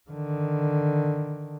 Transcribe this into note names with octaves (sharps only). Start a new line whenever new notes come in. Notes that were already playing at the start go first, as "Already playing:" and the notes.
D3 D#3